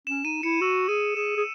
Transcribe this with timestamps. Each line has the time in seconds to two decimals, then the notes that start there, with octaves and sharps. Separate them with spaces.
0.07 C#4 E7
0.25 D#4 D#7
0.43 E4 C#7
0.61 F#4 E6
0.89 G#4 D#7
1.16 G#4 E7
1.37 G#4